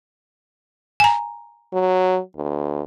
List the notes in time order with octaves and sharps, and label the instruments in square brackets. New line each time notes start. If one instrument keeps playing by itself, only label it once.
[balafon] G#5 A#5
[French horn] F#3
D2